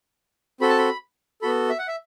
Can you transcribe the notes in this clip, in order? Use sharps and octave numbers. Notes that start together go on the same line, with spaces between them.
C4 F#4 A4 B5
A5
B5
B3 F#4 A4 B5
E5
F#5
E5